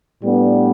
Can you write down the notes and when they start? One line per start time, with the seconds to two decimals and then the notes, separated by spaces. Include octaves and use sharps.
0.22 A2 G3 B3 D4